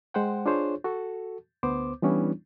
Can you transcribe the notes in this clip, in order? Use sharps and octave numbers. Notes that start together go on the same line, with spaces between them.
G#3 C5 F#5 G5
D4 F4 G#4 C5 C#5
F#4 A4
D2 B3 C5 D6
E3 G3 B3 C#4 D4 E4